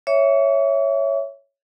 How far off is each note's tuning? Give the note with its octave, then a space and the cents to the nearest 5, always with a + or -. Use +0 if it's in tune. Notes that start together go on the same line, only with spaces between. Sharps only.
C#5 +0 E5 +0 C#6 +45